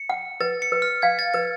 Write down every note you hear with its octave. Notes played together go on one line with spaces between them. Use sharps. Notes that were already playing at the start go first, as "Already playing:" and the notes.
Already playing: C#7
F#5
B4 A6
C#7
B4
F6
F5 G#6
A6
B4 A6